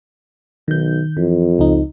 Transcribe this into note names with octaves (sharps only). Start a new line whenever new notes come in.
B1 D#3 G6
F2 E3
C#2 D#4